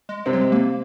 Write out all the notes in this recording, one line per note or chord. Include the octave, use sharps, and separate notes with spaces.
G#3
C3 G#3 C4
F#3
G#3
A#3